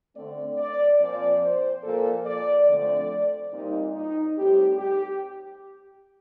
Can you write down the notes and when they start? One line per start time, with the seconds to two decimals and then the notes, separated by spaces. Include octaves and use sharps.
0.15 D3 A3 C4 D5
0.57 D5
0.99 A#2 F3 C4 D5
1.41 C5
1.83 A#2 F3 A#3 A4
2.25 D5
2.67 D3 F3 A3 C4 D5
3.51 A#2 G3 C4 D#4
3.95 D#4
4.36 A2 G3 C4 G4
4.78 G4